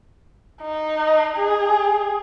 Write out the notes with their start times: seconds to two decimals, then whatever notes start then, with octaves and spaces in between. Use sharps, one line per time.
0.62 D#4
1.37 G#4